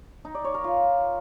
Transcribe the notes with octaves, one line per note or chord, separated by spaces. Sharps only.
D#4
D5
C#5
A#4
F4